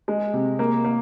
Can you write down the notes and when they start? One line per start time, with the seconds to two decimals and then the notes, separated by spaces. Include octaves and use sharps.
0.08 G#3
0.34 C3
0.59 A#3
0.84 A#3